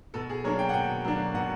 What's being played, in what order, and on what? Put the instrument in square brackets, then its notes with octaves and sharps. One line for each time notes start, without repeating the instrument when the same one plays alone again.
[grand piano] B2 A4
G#4
F#3 A#3 D4 C#5
G5
F#5
B2 G5
F#3 A#3 D4
B2 F#5